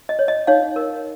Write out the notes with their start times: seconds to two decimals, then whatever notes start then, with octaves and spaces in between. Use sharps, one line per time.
0.09 D#5
0.19 C#5
0.28 D#5
0.47 D#4 C#5 F5
0.76 A#4